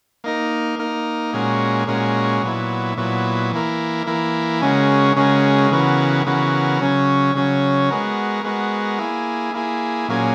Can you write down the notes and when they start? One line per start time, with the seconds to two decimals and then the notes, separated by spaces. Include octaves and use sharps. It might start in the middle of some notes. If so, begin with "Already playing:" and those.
0.24 A#3 D#4 A#4
0.79 A#3 D#4 A#4
1.33 A#2 G#3 C#4 F#4 A#4
1.87 A#2 G#3 C#4 F#4 A#4
2.43 A#2 F#3 B3 E4
2.97 A#2 F#3 B3 E4
3.52 E3 A#3 E4 A#4
4.07 E3 A#3 E4 A#4
4.62 C#3 G#3 C#4 F#4 A#4
5.16 C#3 G#3 C#4 F#4 A#4
5.71 C#3 E3 B3 F#4 A#4
6.26 C#3 E3 B3 F#4 A#4
6.81 C#3 F#3 C#4
7.35 C#3 F#3 C#4
7.90 G#3 B3 F#4 A#4
8.44 G#3 B3 F#4 A#4
8.99 A#3 E4 G#4
9.54 A#3 E4 G#4
10.08 A#2 F#3 A#3 C#4 G#4